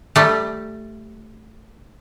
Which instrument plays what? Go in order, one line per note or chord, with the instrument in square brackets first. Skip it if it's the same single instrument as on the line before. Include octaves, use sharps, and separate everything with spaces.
[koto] G3 A3